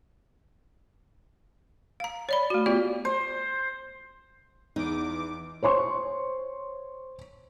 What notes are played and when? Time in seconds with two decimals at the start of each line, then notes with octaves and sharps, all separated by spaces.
2.00 F5 A#5
2.29 C#5 D5 B5
2.50 A3 F#4
2.66 B3 F4 G4 D5
3.05 C5
4.76 E2 D#4 D6
5.63 C5 C#5 C6 C#6